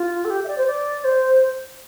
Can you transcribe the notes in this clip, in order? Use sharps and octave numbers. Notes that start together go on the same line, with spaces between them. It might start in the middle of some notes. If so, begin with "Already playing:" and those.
Already playing: F4
A4
G4
E5
D5
C5
D5
C5